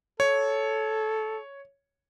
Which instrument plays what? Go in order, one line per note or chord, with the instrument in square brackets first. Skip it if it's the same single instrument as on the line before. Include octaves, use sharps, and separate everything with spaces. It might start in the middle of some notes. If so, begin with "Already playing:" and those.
[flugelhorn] A4 [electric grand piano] C#5